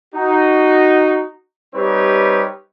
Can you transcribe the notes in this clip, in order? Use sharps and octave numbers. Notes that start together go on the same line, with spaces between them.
D#4 F#4
G3 C4 D#4 G4 B4 C#5